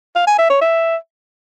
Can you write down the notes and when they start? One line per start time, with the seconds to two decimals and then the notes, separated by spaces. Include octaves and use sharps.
0.16 F5
0.27 G#5
0.39 E5
0.50 C#5
0.61 E5